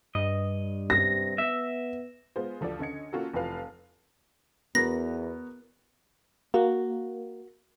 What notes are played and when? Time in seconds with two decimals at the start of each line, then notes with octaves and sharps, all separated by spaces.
0.15 G2 D#5
0.90 C3 A#6
1.38 B3 E5
2.36 G#3 B3 F4 C5
2.60 D2 F3 A4 D5
2.79 D3 C#4 D#5 G#6 C#7
3.13 A#3 C#4 F4 F#4 A4
3.33 F1 E3 F4 B4 F5
4.75 E2 B3 F#4 A#4 A#6
6.54 A#3 F#4